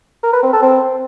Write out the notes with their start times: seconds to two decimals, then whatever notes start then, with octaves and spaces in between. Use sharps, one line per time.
0.23 A#4
0.33 B4
0.43 C4
0.53 A4
0.62 C4